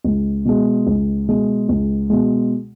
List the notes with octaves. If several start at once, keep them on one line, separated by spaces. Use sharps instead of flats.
C#2
B2 G#3
C#2
B2 G#3
C#2
B2 G#3